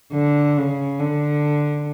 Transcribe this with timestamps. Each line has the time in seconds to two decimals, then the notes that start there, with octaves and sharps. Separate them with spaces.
0.13 D3
0.57 C#3
1.00 D3